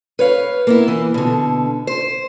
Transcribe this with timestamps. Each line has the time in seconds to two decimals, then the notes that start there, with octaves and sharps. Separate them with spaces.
0.19 B4 C#5 F5
0.67 A#3 B3 E4
0.88 E3
1.14 B2 D3
1.87 C5